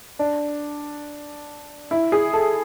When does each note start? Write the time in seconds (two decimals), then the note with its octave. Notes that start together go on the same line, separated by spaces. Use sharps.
0.19 D4
1.91 E4
2.12 G#4
2.33 A4